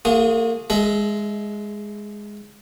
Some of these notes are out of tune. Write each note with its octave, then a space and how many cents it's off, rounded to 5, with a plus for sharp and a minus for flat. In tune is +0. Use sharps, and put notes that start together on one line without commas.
A#3 -35 F4 +40 G#4 +0
G#3 +0 G#4 +45 E5 +0